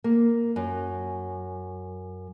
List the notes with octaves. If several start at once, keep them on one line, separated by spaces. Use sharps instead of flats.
A#3
F#2